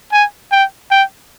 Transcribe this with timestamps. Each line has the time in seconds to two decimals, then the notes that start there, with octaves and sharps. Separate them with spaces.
0.12 G#5
0.52 G5
0.91 G5